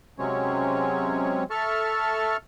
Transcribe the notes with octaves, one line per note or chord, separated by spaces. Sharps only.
C3 F#3 G#3 C4 C#4 C#5
A4 E5 A5 C#6 F6